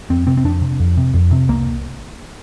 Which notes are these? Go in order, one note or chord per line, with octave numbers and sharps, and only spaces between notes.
F2 C4
C3 C4
C4
F2 D4
C3
F2
C3
F2
C3
C2 A#3